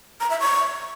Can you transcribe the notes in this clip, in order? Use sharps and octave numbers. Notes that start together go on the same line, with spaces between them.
A#5
E5
C#6